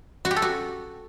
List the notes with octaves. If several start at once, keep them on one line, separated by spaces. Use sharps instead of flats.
F#4
G4
A4
F#4